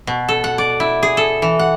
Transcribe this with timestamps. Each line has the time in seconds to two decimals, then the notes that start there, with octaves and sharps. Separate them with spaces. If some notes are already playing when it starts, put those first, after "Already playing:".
0.07 B2
0.29 A4
0.44 F#5
0.58 D5
0.80 E4
1.03 G#4
1.17 A4
1.42 E3
1.59 F#5